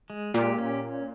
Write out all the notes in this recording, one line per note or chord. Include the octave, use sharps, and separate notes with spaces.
G#3
A#2 G4
C#4